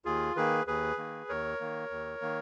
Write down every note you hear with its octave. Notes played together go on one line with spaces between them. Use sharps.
D#2 F4 G#4
D#3 A#3 G#4 B4
D#2 G#4 B4
D#3 A#3
D#2 A#4 C#5
D#3 A#3
D#2
D#3 A#3